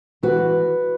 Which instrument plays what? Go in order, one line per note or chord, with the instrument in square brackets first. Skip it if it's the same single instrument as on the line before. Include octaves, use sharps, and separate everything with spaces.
[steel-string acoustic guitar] E3 F#4 B4